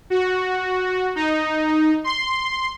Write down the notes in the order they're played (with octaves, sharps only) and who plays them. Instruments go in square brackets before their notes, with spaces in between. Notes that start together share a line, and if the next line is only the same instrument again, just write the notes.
[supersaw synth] F#4
D#4
C6